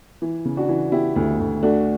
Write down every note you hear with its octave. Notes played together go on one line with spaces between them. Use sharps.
E3
C#3
D4 F#4
E3
E3 E4 G4
D2
D2
A3 D4 F#4